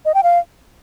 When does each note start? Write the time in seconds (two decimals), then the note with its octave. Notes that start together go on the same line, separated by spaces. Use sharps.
0.05 D#5
0.14 G5
0.23 F5